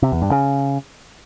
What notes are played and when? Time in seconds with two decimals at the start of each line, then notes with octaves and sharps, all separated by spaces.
0.03 C3
0.12 E2
0.22 G2
0.31 C#3